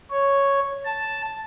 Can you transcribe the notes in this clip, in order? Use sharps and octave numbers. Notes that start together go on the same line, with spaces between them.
C#5
A5